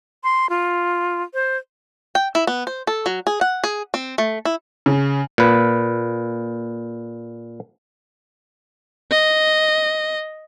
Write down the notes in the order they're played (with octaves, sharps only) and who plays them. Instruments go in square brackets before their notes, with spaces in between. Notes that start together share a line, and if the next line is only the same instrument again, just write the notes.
[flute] C6
F4
C5
[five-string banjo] G5
E4
B3
C5
A4
F#3
G#4
F#5
G#4
C4
A3
E4
[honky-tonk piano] C#3
[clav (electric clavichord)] A#2 B4
[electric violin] D#5